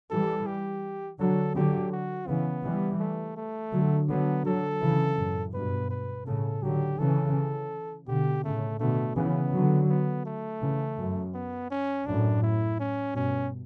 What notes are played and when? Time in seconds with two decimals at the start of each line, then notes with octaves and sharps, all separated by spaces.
0.10 E3 G3 A4
0.46 G4
1.19 D3 F#3 A4
1.54 D3 F#3 G4
1.92 F#4
2.27 C#3 E3 B3
2.63 E3 G3
3.00 A3
3.37 A3
3.72 D3 F#3
4.09 D3 F#3 B3
4.45 D3 F#3 A4
4.81 C#3 E3
5.17 F#2 A2
5.54 G2 B2 B4
5.90 B4
6.26 A2 C#3 A4
6.63 D3 F#3 G4
6.99 C#3 E3 A4
8.07 B2 D3 G4
8.44 A2 C#3 A3
8.80 B2 D3 A3
9.16 C#3 E3 B3
9.52 D3 F#3
9.89 B3
10.26 A3
10.61 C#3 E3
10.98 F#2
11.34 B3
11.71 C#4
12.06 F#2 A2 D4
12.42 E4
12.80 C#4
13.15 G2 B2 C#4